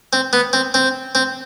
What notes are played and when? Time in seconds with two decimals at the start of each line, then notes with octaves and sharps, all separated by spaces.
0.13 C4
0.33 B3
0.53 C4
0.74 C4
1.15 C4